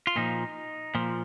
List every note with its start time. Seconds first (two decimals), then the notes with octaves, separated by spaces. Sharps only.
0.07 F4
0.16 A#2 F3 D#4
0.95 A#2 F3